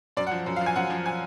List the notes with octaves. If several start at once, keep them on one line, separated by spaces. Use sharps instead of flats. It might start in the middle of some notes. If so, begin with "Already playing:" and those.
F#2 D5
F#5
F3
F#2
F5
F3
G#5
F#2 F#5
F3
G#5